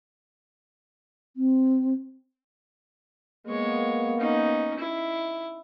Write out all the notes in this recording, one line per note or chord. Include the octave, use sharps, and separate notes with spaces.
C4
G#3 A#3 B3 C#5
C#4 D#4
E4